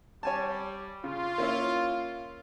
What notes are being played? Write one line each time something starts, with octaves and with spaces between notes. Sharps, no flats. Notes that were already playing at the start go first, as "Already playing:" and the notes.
G3 C#5 G#5 A5
C#3 F4
A#3 C#4 E4